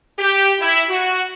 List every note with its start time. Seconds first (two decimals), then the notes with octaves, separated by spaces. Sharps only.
0.19 G4
0.61 E4
0.89 F#4